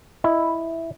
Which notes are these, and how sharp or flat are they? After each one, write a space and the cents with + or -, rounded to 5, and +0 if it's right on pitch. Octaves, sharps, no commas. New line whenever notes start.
E4 +0 D#5 +0